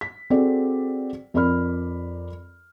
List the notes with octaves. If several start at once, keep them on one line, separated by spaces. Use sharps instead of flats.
B6
C4 F#4 G#4 A4 D5
F2 A#4 D5 B5 F6